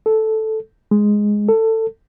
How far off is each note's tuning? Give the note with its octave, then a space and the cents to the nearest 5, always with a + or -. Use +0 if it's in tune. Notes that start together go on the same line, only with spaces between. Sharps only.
A4 -5
G#3 +0
A4 +20